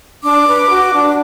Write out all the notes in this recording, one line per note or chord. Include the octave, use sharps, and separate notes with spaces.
D4 D6
B4
F#4
D4